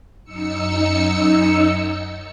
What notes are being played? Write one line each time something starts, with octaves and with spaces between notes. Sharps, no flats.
F#2 D#4 E6 C#7